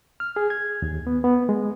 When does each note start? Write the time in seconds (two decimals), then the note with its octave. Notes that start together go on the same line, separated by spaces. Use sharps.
0.20 F6
0.36 G#4
0.50 G#6
0.82 D#2
1.07 B3
1.24 B3
1.49 G#3